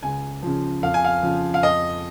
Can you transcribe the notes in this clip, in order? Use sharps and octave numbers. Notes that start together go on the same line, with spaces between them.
C#2 G#5
C#3 F3
F2 F5
G#5
F5
C#3 F3
F5
F2 D#5